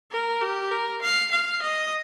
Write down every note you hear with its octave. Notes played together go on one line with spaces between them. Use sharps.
A#4
G4
A#4
F5
F5
D#5